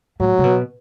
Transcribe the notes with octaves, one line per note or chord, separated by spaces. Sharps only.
A2 F#3
C3
B2